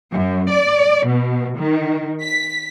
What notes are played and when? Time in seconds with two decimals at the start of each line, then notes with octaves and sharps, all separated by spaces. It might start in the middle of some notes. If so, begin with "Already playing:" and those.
0.13 F#2
0.50 D5
1.07 B2
1.58 D#3
2.22 B6